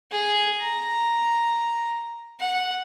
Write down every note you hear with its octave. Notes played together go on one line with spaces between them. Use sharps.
G#4
A#5
F#5